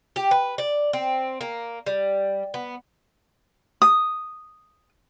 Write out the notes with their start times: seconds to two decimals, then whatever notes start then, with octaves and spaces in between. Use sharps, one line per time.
0.16 G4
0.31 B4
0.58 D5
0.93 C4
1.41 A#3
1.86 G3
2.54 B3
3.82 D#6